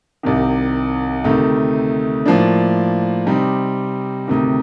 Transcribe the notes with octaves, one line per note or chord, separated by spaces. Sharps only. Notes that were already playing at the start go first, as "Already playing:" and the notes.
C2 C3 D#3
D2 C3 D#3 A3
A2 F3 A#3 D4
C3 G3 C4 D#4
D2 C3 D#3